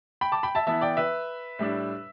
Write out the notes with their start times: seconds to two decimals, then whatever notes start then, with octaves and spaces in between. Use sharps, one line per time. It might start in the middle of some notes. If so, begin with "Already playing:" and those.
0.21 G5 B5
0.32 A5 D6
0.43 G5 B5
0.55 E5 A5
0.67 E3 B3 E4 E5 A5
0.81 D5 G5
0.97 B4 E5
1.59 A2 G3 D4